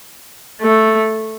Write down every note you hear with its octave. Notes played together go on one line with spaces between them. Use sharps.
A3